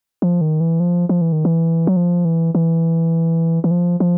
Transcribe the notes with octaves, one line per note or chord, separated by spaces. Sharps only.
F3
D#3
E3
F3
F3
E3
D#3
E3
F#3
F3
E3
E3
E3
F3
F3